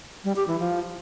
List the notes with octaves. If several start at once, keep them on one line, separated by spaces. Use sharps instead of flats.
G3
G4
E3
F3